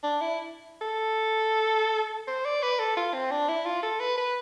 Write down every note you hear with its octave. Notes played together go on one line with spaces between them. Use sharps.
D4
E4
A4
C5
D5
B4
A4
F4
C4
D4
E4
F4
A4
B4
B4